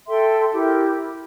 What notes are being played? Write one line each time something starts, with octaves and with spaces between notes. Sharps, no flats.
A4 E5 G5 C6
E4 G4 A#4